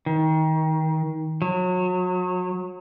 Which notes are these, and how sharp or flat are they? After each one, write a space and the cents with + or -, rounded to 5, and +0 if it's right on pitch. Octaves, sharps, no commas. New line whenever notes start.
D#3 +25
F#3 -30